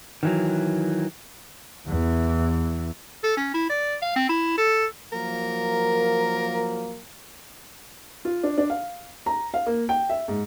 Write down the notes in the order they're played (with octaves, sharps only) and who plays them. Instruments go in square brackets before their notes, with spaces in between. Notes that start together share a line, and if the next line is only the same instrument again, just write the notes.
[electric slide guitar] D#3 E3 F#3
[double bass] E2 E3
[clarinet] A4
C#4
E4
D5
F5
C4
E4
A4
[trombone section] F3 F#3 A#3 [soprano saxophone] A#4
[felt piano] F4
D4
D4
F5
A#5
F5
A#3
G5
E5
G#2